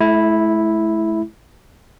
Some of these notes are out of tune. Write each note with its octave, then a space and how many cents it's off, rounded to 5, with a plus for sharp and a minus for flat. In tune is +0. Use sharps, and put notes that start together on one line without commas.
A3 -40 E4 -5